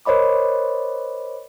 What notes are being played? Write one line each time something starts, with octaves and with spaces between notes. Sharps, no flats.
A#4 C5 C#5 D#5 B5 D6